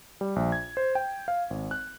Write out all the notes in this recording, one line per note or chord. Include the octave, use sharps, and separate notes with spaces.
G3
A#1
G#6
C5
G5
F5
G#1
F#6